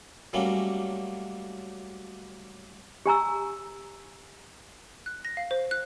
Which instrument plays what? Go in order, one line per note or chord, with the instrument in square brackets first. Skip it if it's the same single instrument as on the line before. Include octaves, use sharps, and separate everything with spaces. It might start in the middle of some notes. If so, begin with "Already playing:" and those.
[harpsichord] F#3 G3 A3 A#3 C#4
[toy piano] G4 G#5 A#5 E6
[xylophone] F#6
A#6
F5
C5
F#6